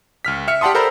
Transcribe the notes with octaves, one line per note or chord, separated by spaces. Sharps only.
C#2 F6 B6
E5 F6 C#7
G4 D5 F#5 A5 C6 D#6
A4 A#4 C5 A#5 B5 G6